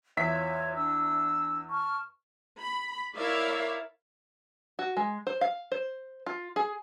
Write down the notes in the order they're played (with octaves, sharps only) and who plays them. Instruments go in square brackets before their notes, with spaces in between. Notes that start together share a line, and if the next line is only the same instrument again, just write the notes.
[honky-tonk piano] E2 E5 B6 [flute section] F4 C#5
[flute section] D4 E6
A5 C#6 F6
[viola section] B5
E4 A#4 C#5 D5 E5 F5
[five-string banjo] F#4
G#3
C5
F5
C5
F4
G#4